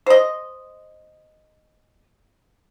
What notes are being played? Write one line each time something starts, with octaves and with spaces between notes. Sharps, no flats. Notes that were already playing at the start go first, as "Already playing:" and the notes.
C5 D#5